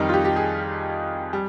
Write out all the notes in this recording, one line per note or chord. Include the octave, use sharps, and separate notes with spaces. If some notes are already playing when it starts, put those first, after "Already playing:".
Already playing: F2 D#3 G3 D#4
F4
G4
G4
G#4
G3